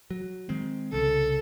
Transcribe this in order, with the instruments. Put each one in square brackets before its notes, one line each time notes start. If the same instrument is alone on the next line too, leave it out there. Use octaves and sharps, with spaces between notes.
[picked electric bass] F#3
D#3 G#3 C4
[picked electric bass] C2 C#3 [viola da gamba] A4